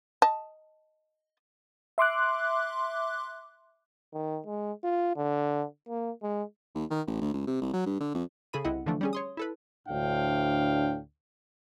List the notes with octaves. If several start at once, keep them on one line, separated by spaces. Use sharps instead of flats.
D#5 A5
E5 C6 D6 F#6
D#3
G#3
F4
D3
A#3
G#3
D#2
D#3
A1
D2
C#2
C3
C2
F#3
G2
D3
F2
C#3 G#4 A4 B5 D#7
C2 C4 E4 D#5 F#5
D3 E3 F3 A3 D4
G3 C#4 G#4
C#5 C6 D#6
E4 A4 B4
D2 A2 D4 F5 G5